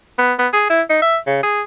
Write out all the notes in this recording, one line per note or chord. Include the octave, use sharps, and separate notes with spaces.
B3
B3
G#4
E4
D#4
E5
C#3
G#4